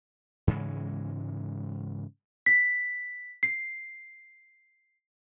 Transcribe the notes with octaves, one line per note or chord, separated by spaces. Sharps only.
G#2 C#3 E3 G#3
B6
C7